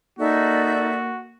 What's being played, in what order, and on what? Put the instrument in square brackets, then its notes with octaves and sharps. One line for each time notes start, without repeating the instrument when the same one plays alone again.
[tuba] A#3 [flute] D#4 [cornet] F#4 [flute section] A4 D5 E5